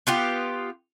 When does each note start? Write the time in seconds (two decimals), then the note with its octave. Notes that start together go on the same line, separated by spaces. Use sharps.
0.07 B3 F4 G4